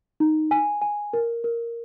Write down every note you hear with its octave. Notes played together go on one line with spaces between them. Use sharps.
D#4
G#5
G#5
A#4
A#4